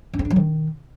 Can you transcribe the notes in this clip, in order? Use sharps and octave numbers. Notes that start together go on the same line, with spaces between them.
C#4
C4
D4
F#3
D#3